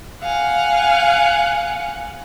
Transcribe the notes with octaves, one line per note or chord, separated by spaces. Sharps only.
F5 F#5 G#5